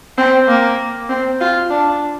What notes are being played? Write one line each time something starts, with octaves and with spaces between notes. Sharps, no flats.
C4
A#3
C4
F4
D4